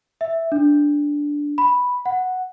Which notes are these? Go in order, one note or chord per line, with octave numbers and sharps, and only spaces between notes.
E5
D4
B5
F#5